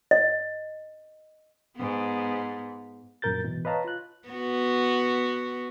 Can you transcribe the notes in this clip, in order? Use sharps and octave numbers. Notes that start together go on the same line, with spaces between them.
D#5
G#2 B3
F#2 A#2 C#3 A#4 G6 A6
G#2 B2 E3
B4 C#5 D#5 F5 A5 A#5
F4 F#6
B3 F#4